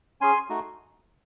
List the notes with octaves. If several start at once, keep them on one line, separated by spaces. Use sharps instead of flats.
C#4 G#4 G#5 C6
A3 D#4 F#4